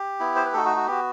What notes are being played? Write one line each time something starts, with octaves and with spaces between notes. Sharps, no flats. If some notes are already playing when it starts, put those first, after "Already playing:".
Already playing: G4
B3 E4
C5
B4
A3 D#4 F#4 A4
F#4
F#4
B3 F#4 G4